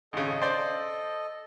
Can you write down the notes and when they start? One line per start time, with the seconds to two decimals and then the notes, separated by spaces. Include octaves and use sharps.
0.13 G#1 C#3 A4 D#5
0.42 C5 D5